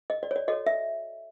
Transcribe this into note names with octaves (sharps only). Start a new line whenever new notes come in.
D#5
D5
C#5
D5
F#4 A4 C#5 D#5
E5